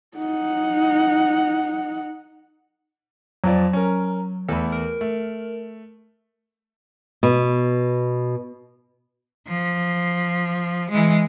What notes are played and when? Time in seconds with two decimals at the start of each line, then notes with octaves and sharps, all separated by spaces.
0.17 D#4 F#5
3.44 F2 F3 F#3 D5
3.73 C#4 A#4
4.49 E2 A3 A4 B5
4.72 A#4
5.01 A3
7.23 B2
9.47 F3
10.90 E3 G#3